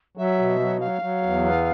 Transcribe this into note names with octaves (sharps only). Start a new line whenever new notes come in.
F#3 E5
B2
F#3
F#3 F5
F#3
E2
B3